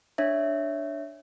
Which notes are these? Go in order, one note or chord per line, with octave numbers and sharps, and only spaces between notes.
D4 C#5 E5